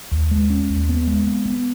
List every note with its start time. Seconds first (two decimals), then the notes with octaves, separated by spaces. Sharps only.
0.11 D#2
0.31 G#3
0.50 C#4
0.70 D#2
0.89 B3
1.07 G#3
1.27 B3
1.46 B3